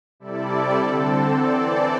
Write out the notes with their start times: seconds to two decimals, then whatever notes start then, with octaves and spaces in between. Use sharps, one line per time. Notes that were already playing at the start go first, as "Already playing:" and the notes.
0.20 C3 G3 E4 A4 D5
0.75 D3 C4 A4
1.31 E3 C4 A4 D5